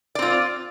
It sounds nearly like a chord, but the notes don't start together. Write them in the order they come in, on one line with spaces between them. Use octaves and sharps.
D5 C4 F4